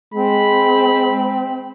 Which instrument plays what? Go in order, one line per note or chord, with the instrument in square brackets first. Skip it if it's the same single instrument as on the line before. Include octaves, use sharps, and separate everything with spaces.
[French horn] G#3 [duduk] C4 [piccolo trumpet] B5